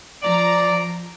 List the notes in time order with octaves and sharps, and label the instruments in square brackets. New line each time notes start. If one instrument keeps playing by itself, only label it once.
[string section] F3 A#5 [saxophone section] D5